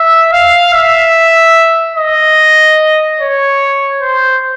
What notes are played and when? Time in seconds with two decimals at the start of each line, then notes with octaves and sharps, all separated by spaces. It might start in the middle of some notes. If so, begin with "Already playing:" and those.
Already playing: E5
0.33 F5
0.73 E5
1.96 D#5
3.20 C#5
4.02 C5